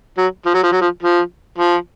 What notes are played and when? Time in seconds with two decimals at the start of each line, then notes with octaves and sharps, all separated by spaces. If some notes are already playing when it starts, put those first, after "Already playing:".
0.18 F#3
0.46 F3
0.54 F#3
0.63 F3
0.72 F#3
0.81 F3
1.03 F3
1.58 F3